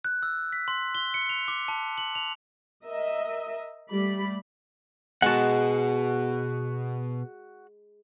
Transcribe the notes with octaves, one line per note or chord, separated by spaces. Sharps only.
F#6
E6
B6
C6
G7
C#7
F7
D6
A5
F#7
F7
A#4 D#5 E5
G3 A3 G4 D5 B5
B2 G#3 B3 F#4 F#5 A5